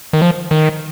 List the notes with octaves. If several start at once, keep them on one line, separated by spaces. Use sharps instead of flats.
D#3
F3
D#3